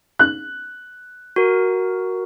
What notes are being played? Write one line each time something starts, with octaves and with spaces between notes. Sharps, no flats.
F#6
F#4 A#4